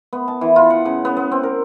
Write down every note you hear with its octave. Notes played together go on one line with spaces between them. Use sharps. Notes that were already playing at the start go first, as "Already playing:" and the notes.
B3
A5
E3
F4
F#5
C#3
B3
B3
C4
A#4